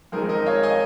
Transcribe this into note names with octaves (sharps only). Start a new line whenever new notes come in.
F2 D#3 G#3 D#4 A#4
A#4 D#5
C#5 F5
D#5 G#5